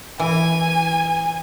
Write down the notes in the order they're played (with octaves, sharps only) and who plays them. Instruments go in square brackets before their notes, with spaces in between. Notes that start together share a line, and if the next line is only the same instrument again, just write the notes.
[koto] E3 [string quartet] G#5